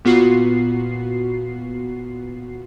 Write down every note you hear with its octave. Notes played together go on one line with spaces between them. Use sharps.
A#2 B3 F4 F#4 C7